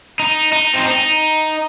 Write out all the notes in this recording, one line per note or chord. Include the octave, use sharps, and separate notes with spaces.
D#4
D#4
C4
D#4